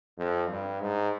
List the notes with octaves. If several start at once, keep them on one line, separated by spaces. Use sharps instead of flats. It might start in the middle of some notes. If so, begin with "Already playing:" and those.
F2
G2
G#2